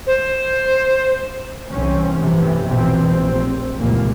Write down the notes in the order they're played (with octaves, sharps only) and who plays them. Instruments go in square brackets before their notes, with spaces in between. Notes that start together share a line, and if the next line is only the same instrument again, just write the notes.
[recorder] C5
[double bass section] C2 E3 C4 C#4
A1 G2 C3 E3 F3
A#1 B2 E3 C4
F1 A#1 C3 C4
F1 C#2 A#2 E3 A#3